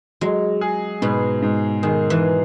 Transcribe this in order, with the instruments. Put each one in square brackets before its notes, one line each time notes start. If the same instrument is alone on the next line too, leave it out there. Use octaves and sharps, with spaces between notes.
[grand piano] F#3 [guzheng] G#3
[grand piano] G#4
[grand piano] G#2 [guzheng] B2
[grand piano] G#2
[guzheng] D#3 [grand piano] G#4
[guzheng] E3